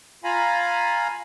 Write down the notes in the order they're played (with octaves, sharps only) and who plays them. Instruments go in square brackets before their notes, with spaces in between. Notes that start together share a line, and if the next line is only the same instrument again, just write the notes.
[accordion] F4 F5 G#5 A#5 B5